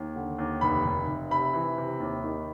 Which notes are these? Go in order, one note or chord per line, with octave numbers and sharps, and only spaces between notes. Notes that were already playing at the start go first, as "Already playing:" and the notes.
Already playing: D#2
D3
D#2
F1 B5
F1
F1
C3 B5
E3
C3
D#2
D#3